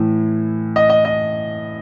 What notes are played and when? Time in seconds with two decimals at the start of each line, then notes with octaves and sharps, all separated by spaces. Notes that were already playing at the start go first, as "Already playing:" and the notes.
Already playing: A2 E3
0.76 D#5
0.90 D#5
1.05 D#5